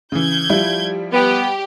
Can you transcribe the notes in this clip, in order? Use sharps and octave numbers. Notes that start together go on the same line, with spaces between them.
C#3 E3 G6 G#6
F3 G3 E4
B3 G4